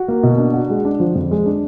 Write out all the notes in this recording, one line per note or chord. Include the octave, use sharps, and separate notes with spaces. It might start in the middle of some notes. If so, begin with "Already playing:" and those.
Already playing: F#4
A#3
B2
D4
F#4
G#3
D4
F3
F2
G#3
D4